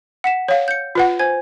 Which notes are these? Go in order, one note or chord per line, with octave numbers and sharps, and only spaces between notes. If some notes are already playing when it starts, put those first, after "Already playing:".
F#5 B6 E7
C#5 F5
G6 C#7
F4 B4 F#5
C5 G#5 G#6